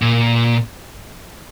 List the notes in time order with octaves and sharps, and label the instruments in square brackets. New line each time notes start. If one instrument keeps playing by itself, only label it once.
[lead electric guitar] A#2